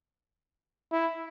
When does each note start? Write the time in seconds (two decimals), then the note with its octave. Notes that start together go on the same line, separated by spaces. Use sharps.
0.92 E4